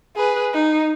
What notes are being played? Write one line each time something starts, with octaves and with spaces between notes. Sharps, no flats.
G#4 B4
D#4